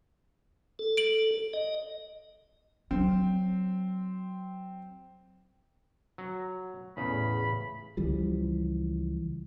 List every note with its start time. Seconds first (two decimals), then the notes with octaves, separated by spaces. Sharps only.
0.79 A4
0.97 D7 F#7
1.53 D#5
2.91 F#3 C4
6.18 F#3
6.97 E2 A2 C#3 B5
7.97 C#2 E3 F3 G3